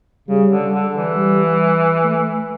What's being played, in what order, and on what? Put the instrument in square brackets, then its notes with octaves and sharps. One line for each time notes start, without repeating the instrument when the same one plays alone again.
[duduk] C#3 [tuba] G3
[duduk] D3
D3
E3
[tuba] G3
A3